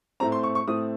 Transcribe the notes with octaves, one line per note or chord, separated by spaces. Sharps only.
A2 A3 C4 A#5
C6
C#6
C#6
A2 A3 C4 D#6